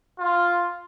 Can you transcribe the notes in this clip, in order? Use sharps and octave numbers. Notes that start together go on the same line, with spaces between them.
F4